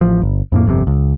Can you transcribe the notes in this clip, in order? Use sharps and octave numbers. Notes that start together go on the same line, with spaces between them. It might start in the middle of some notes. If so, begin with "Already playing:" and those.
A1 F3
G1
F2 A2 A#3
G1 F2 G#2 C3
C#2